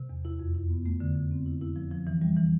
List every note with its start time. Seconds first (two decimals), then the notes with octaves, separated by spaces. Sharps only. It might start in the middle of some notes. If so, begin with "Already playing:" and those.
Already playing: C3
0.09 E2
0.25 E4
0.39 F2
0.55 E4
0.70 B3
0.86 A3
1.00 D3
1.15 D3
1.31 C4
1.46 E4
1.61 E4
1.76 F3
1.91 F3
2.07 E3
2.22 G3
2.37 E3